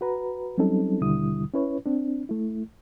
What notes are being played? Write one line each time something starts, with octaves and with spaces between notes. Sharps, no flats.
F#4 B4 A#5
F#3 G3 C4 C#4 D#4 A4
D#2 B2 D3 G3 E4 D#6
C#4 E4 B4 C#5
C4 D4
A3 E4